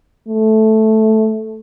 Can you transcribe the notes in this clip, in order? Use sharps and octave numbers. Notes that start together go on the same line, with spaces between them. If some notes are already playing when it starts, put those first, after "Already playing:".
A3